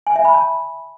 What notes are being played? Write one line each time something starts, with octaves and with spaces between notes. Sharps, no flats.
G#5
E5
B5
A5